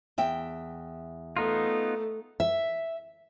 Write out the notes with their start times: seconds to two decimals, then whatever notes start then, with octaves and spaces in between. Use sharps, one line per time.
0.18 E2 E5 G5
1.37 A3 B3 D#4 F4
2.40 E5